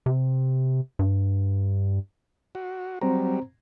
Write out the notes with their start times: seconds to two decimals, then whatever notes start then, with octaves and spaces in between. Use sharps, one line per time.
0.06 C3
0.99 G2
2.55 F#4
3.01 F#3 G3 C4 C5 A#5